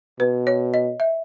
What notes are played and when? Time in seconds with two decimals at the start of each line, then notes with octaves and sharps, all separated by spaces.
0.20 B2 B4
0.47 C#5
0.74 D#5
1.00 E5